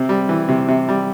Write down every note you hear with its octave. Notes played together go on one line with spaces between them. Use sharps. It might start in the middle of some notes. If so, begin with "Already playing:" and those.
Already playing: C3 C4
G3
E3
C3
C3
G3